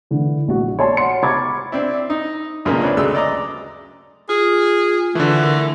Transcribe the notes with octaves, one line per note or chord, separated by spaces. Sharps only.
D3 E3
A#1 F#4
C#5 D5 G#5 A5 C6
C#5 F#5 C6 C#7
A#5 B5 C#6 D6 G#6 A6
C4 D4 E4
D#4
B1 F#2 A#2 C#3 G#3 A#3
C4 D4 B4 C#5
D2 C#3 F#3 G#3 A3 E6
D5 D#5 A#5 D6
F4 G#4
D3 E3 A3
A#4